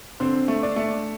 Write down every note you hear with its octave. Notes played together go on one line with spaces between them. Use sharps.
D3 C4 C5
A3
D4 D5
A3